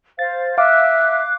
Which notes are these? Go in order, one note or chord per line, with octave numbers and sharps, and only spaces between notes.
C5 F5 A6
E5 F5 D6 F#6